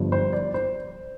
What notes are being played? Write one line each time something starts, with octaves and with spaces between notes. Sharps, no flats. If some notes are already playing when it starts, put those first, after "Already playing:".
Already playing: G1 G2 F3
C5
D5
C5